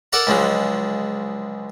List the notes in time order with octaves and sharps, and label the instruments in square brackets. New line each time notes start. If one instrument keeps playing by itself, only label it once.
[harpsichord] A4 A#4 D5 F#5 A#5
C#2 D3 F3 F#3 G#3